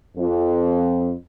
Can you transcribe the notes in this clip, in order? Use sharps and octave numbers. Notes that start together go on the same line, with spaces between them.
F2